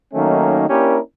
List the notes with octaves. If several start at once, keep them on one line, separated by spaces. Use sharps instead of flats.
D#3 F#3 A3 A#3 C#4 D#4
A#3 C#4 D4 E4 G4 A#4